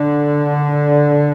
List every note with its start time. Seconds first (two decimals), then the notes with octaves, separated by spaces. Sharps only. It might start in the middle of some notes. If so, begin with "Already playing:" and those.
Already playing: D3